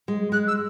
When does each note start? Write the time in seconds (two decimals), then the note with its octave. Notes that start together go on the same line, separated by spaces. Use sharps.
0.08 G#3
0.32 G#3 F#6
0.47 E6